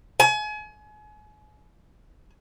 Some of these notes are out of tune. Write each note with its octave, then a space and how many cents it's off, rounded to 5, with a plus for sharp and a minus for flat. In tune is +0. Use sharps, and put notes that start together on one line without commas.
G#5 +35